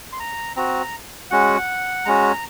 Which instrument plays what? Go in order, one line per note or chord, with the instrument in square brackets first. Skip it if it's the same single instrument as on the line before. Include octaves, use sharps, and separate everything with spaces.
[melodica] C6
A#5
C4 F#4 A#5
G#3 C#4 F#4 F#5
G#3 C#4 F#4 A#5